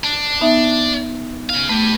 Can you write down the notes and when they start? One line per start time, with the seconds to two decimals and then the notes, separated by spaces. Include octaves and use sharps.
0.04 D4
0.41 B3 D#4 E5
1.49 C#3 F5
1.69 A3 G4 B4